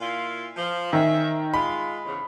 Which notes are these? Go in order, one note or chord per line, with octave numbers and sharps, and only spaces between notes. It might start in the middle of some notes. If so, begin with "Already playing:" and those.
A#2 E4 F4
F3
D#3 G#4 C#5 E5
G#3 F4 B5
E2 G#2 C#3